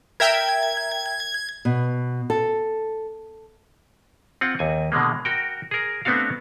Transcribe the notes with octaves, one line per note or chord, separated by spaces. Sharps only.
A#4 E5 G5 G#6
B2
A4
C4 F4 F#5
D#2 G#5
B2 D3 G#3 A#3
F#4 A#4 G5
G#4 A#4
A3 B3 C4 D4 F#4 F5